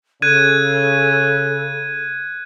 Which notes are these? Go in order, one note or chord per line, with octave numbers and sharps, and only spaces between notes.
C#3 A4 F#6 G#6 D#7